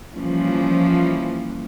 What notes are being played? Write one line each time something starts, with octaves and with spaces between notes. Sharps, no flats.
E3 F3 G3 A#3 C#4